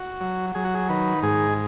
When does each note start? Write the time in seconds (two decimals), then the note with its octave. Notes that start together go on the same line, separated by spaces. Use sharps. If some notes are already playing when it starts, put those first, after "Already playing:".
Already playing: F#4
0.21 F#3
0.55 F#3 G#4
0.65 F#4
0.75 G#4
0.89 D#3 B4
1.23 G#2 G#4